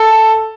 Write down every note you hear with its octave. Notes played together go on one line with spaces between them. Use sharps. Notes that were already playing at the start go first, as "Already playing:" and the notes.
Already playing: A4